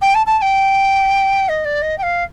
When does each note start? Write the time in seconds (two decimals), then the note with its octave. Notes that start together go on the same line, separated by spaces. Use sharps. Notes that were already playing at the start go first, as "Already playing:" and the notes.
0.01 G5
0.15 A5
0.26 A5
0.38 A5
0.42 G5
1.49 D#5
1.65 D5
1.82 D#5
1.98 G5
2.03 F5